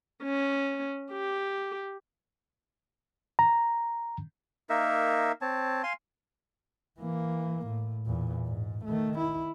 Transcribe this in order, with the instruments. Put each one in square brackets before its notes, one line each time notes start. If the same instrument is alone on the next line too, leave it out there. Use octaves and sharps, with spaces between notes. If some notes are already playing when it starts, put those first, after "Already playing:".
[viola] C#4
G4
[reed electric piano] A#5
[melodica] A#3 D#4 A#4 E5
C4 C#5 A5
F5 G#5 C6
[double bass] E3 A#3
A2
E2 A#2
G#2
D#3 A3
E4